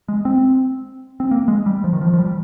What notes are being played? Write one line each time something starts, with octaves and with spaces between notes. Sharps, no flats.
G#3
C4
C4
A#3
G#3
G3
F3
D#3
F3
F3
G3